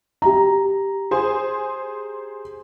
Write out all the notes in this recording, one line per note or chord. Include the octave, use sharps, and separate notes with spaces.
G4 A#5
G#4 C5 G#5